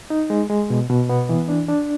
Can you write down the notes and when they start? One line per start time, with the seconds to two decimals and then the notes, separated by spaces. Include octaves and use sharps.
0.10 D#4
0.30 G#3
0.50 G#3
0.70 B2
0.90 B2
1.09 B3
1.29 E3
1.48 D4
1.68 D4